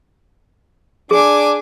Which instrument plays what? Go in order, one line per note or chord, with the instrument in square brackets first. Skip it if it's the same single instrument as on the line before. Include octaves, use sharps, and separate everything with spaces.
[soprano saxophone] D4 [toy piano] G#4 [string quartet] G#5 D6